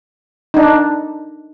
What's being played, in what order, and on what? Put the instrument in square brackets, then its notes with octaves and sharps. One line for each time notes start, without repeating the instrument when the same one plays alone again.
[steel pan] D4 D#4